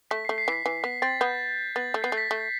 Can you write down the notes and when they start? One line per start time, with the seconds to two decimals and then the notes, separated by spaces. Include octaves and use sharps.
0.11 A3 B6
0.25 C7
0.29 A3
0.38 C7
0.48 E3 B6
0.66 E3 C7
0.84 B3 B6
1.02 C4 A6
1.21 B3 G6
1.76 B3 A6
1.94 A3
2.03 B3 C7
2.12 A3
2.17 B6
2.31 A3